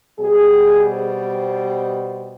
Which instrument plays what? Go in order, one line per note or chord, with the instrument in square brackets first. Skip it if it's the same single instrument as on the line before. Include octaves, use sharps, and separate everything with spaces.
[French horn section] B2 G3 G#4
C5